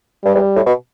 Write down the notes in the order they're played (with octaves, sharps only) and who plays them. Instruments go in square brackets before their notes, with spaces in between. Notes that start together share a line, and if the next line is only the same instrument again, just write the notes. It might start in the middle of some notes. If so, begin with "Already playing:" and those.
[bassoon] G2 [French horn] G3
[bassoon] E2
A2
B2